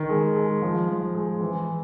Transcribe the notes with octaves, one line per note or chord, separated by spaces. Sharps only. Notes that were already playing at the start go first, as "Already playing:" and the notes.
Already playing: D#3
G#3
G#3
F3
F3
G#3
E3